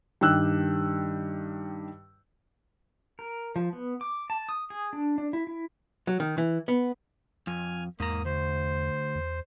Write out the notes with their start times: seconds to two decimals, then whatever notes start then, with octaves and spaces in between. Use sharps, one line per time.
0.21 G2 D#3 G4 G5 E6 F#6
3.19 A#4
3.56 F3
3.73 B3
4.01 D6
4.30 A5
4.49 D#6
4.70 G#4
4.93 D4
5.18 D4
5.33 E4
5.47 E4
6.07 F#3
6.20 D#3
6.38 E3
6.68 B3
7.47 F2 G#5 F6
8.00 E2 G#2 A#3 A#5 D#6
8.25 D2 C5
9.15 E2